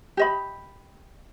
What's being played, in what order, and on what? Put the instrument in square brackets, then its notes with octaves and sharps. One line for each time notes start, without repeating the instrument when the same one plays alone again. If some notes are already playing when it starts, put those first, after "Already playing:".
[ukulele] G4 D#5 B5